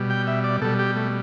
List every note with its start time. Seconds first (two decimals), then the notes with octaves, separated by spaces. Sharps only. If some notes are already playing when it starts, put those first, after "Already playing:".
Already playing: B2 G3
0.10 G5
0.27 E5
0.44 D5
0.62 B2 G3 A4
0.79 G4
0.96 A3